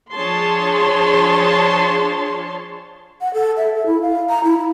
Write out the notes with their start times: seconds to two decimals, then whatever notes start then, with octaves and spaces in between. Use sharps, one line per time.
0.11 F3 D4 G#4 C#5 A5 C6
3.21 F#5
3.34 A4
3.57 E5
3.74 A4
3.86 E4
4.02 F5
4.29 A#5
4.44 E4
4.58 E4